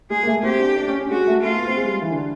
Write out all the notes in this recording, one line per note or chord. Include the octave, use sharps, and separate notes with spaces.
G#3 G#4
A#3
A3
C4 G4
D4
D4
C#4
C#4
G#3 F#4
A3
A3 F4
B3
C4
G#3
G3
E3
D3